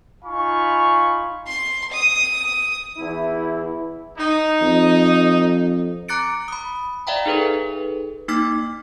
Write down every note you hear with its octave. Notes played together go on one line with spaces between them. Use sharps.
D#4 F4 F5 G#5 B5 C#6
C6
D#6
E2 E4
D#4
F2
A#5 D6 F#6 A6 C#7 D7
B5 D#6
D5 E5 F5 G5 A#5
D#4 G#4 A4 B4
A#3 D#4 D6 F6 A6 B6